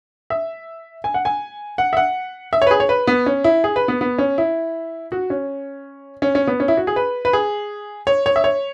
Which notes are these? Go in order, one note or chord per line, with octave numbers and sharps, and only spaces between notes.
E5
G#5
F#5
G#5
F#5
E5
F#5
E5
C#5
B4
G#4
C#5
B4
B3
C#4
E4
G#4
B4
B3
B3
C#4
E4
F#4
C#4
C#4
C#4
B3
C#4
E4
F#4
G#4
B4
B4
G#4
C#5
C#5
E5
C#5